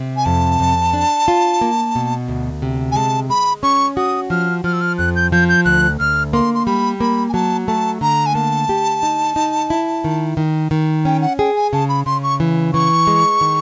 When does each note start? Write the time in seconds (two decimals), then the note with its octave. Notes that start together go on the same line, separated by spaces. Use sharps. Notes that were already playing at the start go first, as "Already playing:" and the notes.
Already playing: C3
0.17 G#5
0.26 F2 A5
0.60 F2
0.93 D4
1.28 F4
1.61 A#3
1.95 B2
2.28 D2
2.62 C3
2.92 G#5
2.96 G#3 A5
3.30 G#3 B5
3.63 C#4 C#6
3.97 F#4 D#6
4.30 F3 F6
4.64 F3 F6
4.73 E6
4.81 F6
4.98 F2 F#6
5.16 G6
5.32 F3 G6
5.49 G6
5.65 D2 F#6
6.00 D2 F6
6.33 A#3 C6
6.54 C6
6.66 G3 B5
7.00 A#3 B5
7.29 G#5
7.34 F#3 A5
7.67 A3 A5
8.01 D3 A#5
8.26 G#5
8.35 A#3 A5
8.69 G4
9.03 D#4
9.36 D#4
9.70 E4
10.04 D#3
10.37 D#3
10.71 D#3
11.05 C#4 G5
11.22 F#5
11.39 G#4 G5
11.56 G#5
11.73 C#3 A5
11.89 B5
12.06 C#3 C6
12.23 C#6
12.40 E3
12.74 E3 C#6
13.07 G#3
13.41 D#3